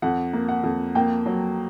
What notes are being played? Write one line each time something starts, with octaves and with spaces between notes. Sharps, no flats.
F2 F#5
A#3
F#5
F2
A#3 G5
F#3